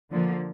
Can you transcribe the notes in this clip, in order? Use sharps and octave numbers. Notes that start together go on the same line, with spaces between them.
D3 F3 A#3